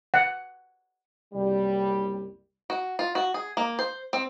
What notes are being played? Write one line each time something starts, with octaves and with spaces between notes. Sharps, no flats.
F#5
F#1 C2 G3
F#4
F4
F#4
G#4
A#3
C5
C4